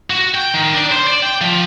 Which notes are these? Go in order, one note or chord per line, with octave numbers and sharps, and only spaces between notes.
F#4
G5
D#3
D4
C5
D5
G5
F3